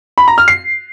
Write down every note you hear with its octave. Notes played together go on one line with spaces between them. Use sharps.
B5
A#5
F6
C7